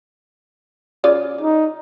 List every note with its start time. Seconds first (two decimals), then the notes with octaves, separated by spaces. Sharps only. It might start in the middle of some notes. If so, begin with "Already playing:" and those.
1.04 C#3 F4 D5
1.41 D#4